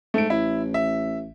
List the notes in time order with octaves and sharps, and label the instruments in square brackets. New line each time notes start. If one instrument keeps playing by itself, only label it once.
[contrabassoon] G#2 [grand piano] A3 D7
[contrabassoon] A1 [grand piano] E4
[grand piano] E5